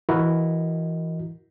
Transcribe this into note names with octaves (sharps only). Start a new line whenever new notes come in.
E3 E4 F#4 A#4 D#5